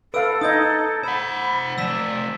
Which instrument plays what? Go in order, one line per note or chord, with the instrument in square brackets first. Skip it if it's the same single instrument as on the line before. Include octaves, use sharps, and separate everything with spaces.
[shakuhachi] A4 [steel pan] B4 F5 [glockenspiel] E6 D7
[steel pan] D#4 D#5 [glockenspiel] D#6 G6 G#6
[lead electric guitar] C5 F#5 [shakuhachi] B5
[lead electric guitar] F3 A3 [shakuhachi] D5 [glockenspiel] E6 B6 E7